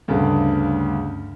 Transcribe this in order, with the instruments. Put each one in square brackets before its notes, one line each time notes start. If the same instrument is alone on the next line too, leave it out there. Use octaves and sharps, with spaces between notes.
[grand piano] D2 G2 C#3